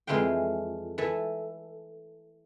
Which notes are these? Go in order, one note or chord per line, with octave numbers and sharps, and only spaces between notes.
F2 E3 G#3 A3 F5 G5
E3 A4 E5